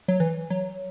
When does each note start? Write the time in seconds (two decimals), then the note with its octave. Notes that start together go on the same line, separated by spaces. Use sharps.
0.08 F#3
0.20 E3
0.50 F#3